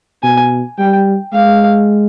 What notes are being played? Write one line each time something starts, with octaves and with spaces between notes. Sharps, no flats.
B2 G#5
G3 G5
G#3 F5